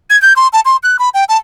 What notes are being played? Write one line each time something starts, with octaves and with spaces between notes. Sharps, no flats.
G#6
G6
C6
A5
C6
F#6
B5
G5
A5